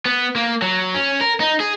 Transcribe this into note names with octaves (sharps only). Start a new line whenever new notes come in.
B3
A#3
F#3
C#4
A#4
D#4
G#4